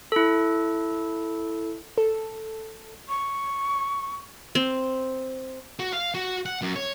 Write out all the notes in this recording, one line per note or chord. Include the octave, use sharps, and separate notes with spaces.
E4 A4
A4
C#6
C4
F#4
F5
F#4
F#5
F#2
C#5